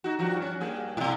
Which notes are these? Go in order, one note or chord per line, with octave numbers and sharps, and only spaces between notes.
D#4 F#4
G2 F3 F#4
C#4
G2 A#3 G#4
G#2 B2